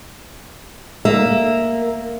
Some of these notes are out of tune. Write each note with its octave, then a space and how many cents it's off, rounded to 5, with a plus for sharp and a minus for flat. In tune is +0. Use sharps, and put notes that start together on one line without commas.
A#3 +0 E5 +0